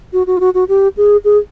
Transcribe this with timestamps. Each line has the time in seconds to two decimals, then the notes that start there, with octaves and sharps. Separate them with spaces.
0.13 F#4
0.27 F#4
0.37 F4
0.40 F#4
0.55 F#4
0.69 G4
0.97 G#4
1.25 G#4